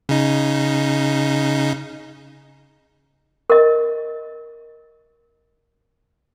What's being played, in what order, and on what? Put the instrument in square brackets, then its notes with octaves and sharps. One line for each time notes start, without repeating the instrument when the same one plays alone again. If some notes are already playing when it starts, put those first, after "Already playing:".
[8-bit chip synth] C#3 D#4
[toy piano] A#4 D#5